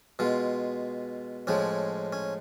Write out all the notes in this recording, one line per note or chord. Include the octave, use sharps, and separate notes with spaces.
B2 G#3 F4
A2 F3 G#3 C#4
C#4